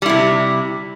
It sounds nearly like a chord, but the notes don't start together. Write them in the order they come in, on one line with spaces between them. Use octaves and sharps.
G3 E4 C3